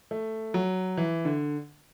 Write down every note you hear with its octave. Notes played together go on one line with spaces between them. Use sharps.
A3
F#3
E3
D3